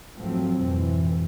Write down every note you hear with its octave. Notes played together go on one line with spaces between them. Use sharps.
G#1 F3 F#3 A3 C4
F2 G#2 B2 E3